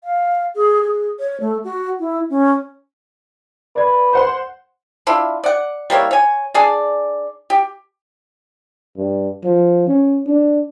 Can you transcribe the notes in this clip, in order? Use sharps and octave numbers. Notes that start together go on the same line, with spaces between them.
F5
G#4
G#4
C#5
A3
F#4
E4
C#4
B4 D5 G#6
C5 F#5 C6
D4 E4 F4
D5 F#5
G3 A#3 E4 C#5
C#5 G#5
D4 G#4 D5
G4
G2
F3
C#4
D4